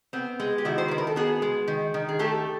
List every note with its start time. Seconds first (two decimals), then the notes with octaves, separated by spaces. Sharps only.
0.13 B3 C4
0.40 G#3
0.58 G4
0.65 D#3 E4 F#4
0.78 C5
0.88 D#3 B4
0.98 A#4
1.07 A4
1.16 B3 F#4 G#4
1.42 G#3
1.68 D#3
1.94 D#3
2.09 G#4
2.19 A3 G4 A4